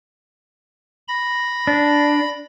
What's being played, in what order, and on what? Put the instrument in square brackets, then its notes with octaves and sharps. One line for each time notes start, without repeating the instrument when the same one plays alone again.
[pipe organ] B5 A#6
[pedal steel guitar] D4